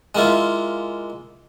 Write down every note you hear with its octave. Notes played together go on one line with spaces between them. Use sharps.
G#3 A#3 E4 F4